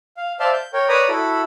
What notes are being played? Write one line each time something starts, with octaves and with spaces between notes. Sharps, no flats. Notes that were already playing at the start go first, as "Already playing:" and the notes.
F5
C5 D5 E5 F5 A5 C6
G6
A#4 C#5 G5
B4 C#5 D5 A#5 B5 D#6
E4 F#4 A4 B5